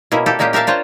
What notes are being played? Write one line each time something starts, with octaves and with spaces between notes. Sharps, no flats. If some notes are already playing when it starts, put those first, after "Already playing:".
B2 A#3 C#4 E4
A#3 G4 A4
A#2 G#3 A#3 C#4 G4
G4 A#4 E5 F5 A5
D4 F4 C5 C#5